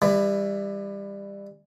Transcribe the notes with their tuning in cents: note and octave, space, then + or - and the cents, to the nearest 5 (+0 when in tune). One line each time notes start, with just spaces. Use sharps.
E3 +0 G3 +25